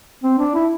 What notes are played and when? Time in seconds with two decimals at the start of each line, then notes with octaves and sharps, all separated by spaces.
0.23 C4
0.39 D4
0.55 E4